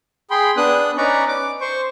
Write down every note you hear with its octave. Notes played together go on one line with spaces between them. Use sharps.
G#4 G5 B5 C6
B3 D4 D#6 F#6
C#4 D#4 B4 D5 A#5 C#6
D6
C5 C#6